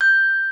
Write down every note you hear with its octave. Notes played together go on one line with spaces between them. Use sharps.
G6